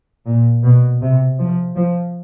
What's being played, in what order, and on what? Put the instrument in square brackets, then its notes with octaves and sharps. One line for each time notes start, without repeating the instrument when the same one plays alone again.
[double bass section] A#2
B2
C3
F3
F3